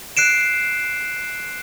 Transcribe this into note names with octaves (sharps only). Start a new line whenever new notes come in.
F#6 C7 D7 E7